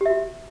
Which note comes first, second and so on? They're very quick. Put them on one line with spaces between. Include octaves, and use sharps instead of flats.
G4 E5 F#4